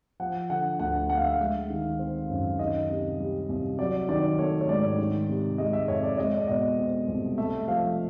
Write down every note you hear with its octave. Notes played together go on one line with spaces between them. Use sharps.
F3 F#5
D3 F#5
D2 F#5
D2 F#5
F5
E5
F5
G#3
D#3
C4
F#2
D#3 D#5
C3
G3
C2
F#3 D5
D#3 D5
A3 C#5
C#5
G#2 D5
D#3
C3
G#3 D#5
E5
F2 C#5
D5
G#3 D#5
D5
B2 D#5
C4
C2
A3 E5
F3 F5